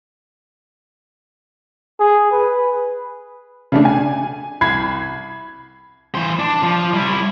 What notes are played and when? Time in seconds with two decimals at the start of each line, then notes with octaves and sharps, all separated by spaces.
2.00 G#4
2.32 B4
3.72 C#3 A3 D4
3.85 G#5
4.61 C2 B5 G#6 C7
6.15 E3 C5
6.39 D4
6.63 F3
6.93 G3 E4